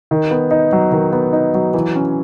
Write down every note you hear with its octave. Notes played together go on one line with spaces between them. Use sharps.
D#3
B3
D#4
F#3
D#3
B3
D#4
F#3
E3
C#4